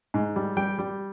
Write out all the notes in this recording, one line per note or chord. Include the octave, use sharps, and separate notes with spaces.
G#2
G3
G3 G5
G3